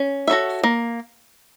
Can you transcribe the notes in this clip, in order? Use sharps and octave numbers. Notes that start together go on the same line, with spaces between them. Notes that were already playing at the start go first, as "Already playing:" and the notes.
Already playing: C#4
F#4 A4 C#5 E5
A#3